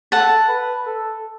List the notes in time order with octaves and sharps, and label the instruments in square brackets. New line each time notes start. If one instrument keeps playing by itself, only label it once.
[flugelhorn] A4 [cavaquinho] F#5 A5
[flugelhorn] B4
A4